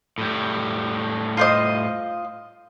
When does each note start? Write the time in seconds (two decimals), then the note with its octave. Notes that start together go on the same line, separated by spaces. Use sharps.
0.18 A2 G3
1.37 F4 C5 D#5